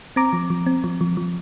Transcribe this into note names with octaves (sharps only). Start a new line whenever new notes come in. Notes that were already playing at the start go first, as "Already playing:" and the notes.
C4 A#5 D6
F3
F3
C4
F3
F3
F3